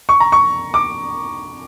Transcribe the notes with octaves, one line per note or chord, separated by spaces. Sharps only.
C#6
A#5
C#6
D6